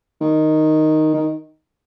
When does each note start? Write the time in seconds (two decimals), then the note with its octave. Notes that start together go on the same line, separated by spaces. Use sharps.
0.21 D#3
1.14 D#3